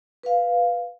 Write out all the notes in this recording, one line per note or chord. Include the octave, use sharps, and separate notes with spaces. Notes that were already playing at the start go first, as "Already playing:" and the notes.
B4 F5